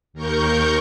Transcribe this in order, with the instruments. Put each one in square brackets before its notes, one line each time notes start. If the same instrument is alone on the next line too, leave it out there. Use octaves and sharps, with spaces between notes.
[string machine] D#2 A#4 C#6 G6